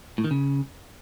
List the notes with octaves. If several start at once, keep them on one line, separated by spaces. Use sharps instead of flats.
A2
D#3
C#3